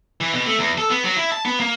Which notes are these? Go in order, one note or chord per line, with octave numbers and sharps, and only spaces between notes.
E3
B2
A3
E2
A4
B3
F#3
E4
A5
B3
A#3